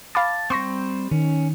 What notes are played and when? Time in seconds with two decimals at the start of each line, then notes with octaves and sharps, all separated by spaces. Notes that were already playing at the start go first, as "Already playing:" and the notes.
0.15 F5 A5 B5 D6
0.50 G3 C4 C6 C#6 A#6
1.11 D#3 C#4